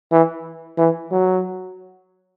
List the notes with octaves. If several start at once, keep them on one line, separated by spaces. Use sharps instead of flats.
E3
E3
F#3